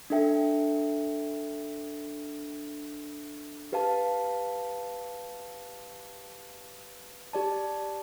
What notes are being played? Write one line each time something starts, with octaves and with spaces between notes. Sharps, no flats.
D4 A4 E5 G5
G4 B4 F5 A5
G4 D5 A5